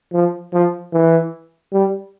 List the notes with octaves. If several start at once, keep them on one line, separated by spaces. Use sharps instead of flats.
F3
F3
E3
G3